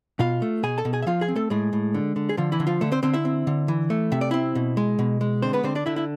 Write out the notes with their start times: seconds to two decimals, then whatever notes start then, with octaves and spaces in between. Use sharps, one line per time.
0.19 B2 F4 F5
0.42 A3
0.63 B2 G#4 G#5
0.78 A4 A5
0.85 B2
0.93 G#4 G#5
1.02 E5
1.07 F3 F4 F5
1.21 G#4 G#5
1.28 C4
1.36 A3 A4
1.50 A2 G#3 G#4
1.73 A2
1.94 D3
2.16 D3
2.29 G#4
2.37 D3 F3 F4
2.52 E3 E4
2.60 D3
2.67 F3 F4
2.81 D3 A3 A4
2.92 C4 C5
3.03 D3 C4 C5
3.14 E4 E5
3.25 C4
3.47 D3
3.68 E3
3.90 A3
4.12 C3 E5
4.21 D5
4.31 C4 E4 E5
4.55 B2
4.77 G#3
4.99 B2
5.21 G#3
5.42 D3 C4 C5
5.53 B3 B4
5.64 D3 C4 C5
5.75 D4 D5
5.86 D3 E4 E5
5.96 E4 E5